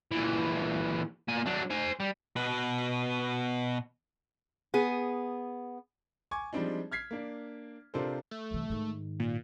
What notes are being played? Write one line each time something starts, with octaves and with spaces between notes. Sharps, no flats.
A#2 E3
A#2 G#5
F#3 D4
C5 G#5
G3
B2 B4
B3 G#4
G#5 C#6 D6 G#6
F3 G3 G#3 C4 D4 D#4
F6 G#6 B6 C7
A#3 D4
C3 D4 F4 A4 A#4 C5
A3
C2 E3
G#2 D#3
A#2